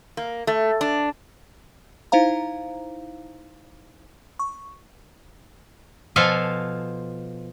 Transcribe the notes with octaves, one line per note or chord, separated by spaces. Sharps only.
A#3
A3
D4
D#4 E4 C5 F5 A#5
C#6
B2 F3 F4 A4 F5 G#5